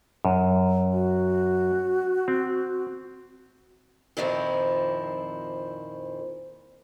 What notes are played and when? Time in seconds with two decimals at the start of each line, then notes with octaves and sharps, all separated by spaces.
0.25 F#2
0.93 F#4
2.28 C4
4.17 F2 A#2 D#3 F3 C4 E4